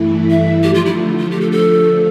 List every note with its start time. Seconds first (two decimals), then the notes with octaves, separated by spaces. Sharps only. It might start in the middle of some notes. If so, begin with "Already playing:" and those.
Already playing: G2 E3 A3 E4
0.30 E5
0.63 D3 F3 A3 G4
0.74 F4
0.86 E4
1.19 F4
1.31 G4
1.41 A4
1.52 A4